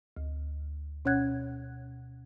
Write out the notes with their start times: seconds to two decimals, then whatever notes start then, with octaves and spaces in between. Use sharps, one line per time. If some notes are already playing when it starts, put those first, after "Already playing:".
0.17 D2
1.05 B2 C#4 C#5 F#5 F#6 G#6